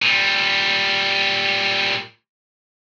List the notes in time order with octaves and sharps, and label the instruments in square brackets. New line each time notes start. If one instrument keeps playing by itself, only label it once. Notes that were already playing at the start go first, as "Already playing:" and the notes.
[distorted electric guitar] A#2 G3